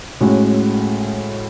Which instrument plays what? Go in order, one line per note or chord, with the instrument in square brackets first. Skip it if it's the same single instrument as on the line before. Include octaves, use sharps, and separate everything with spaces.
[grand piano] A2 G#3 C#4 F#4